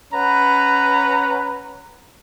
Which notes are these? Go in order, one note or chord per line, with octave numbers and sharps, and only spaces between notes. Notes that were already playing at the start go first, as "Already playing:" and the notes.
C#4 B4 F#5 A#5